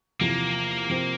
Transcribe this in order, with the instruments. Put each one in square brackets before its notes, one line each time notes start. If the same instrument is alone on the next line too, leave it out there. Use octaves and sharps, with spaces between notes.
[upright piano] E2 C3 F3 [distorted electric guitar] A#3
[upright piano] C3 F3 C4